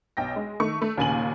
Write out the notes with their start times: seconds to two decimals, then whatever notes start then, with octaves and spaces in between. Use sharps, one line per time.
0.17 B1 G5 A#6
0.36 G#3
0.60 D#3 A3 C#6
0.82 A3
0.97 D#2 A#2 C#3 G#5 D#7 F#7